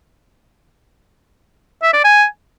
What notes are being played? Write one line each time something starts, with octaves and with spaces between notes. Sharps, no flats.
E5
D5
G#5